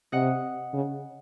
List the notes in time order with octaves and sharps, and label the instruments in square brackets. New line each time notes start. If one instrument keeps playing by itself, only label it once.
[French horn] C3 [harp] D#5 F#5
[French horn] C#3